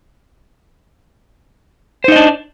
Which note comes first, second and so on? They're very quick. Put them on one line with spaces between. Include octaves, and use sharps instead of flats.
C5 D#4 D#5 D4